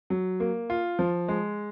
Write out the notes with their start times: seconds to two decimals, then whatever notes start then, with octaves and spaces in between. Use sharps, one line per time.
0.10 F#3
0.40 A#3
0.70 F4
0.99 F3
1.28 G#3